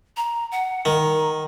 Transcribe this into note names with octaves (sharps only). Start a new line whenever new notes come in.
A#5
F#5
D#3 A#5